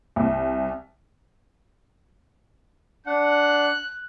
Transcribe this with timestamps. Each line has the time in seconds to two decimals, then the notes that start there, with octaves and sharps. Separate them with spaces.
0.16 C2
3.06 D4 F#5 F#6